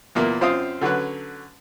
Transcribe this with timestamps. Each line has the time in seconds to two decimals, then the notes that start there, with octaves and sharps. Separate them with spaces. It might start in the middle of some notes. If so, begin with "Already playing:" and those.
0.15 E2 A#2 A#3
0.41 F#2 C4 F4 F5 D#6
0.81 D3 F#3 C#4 B4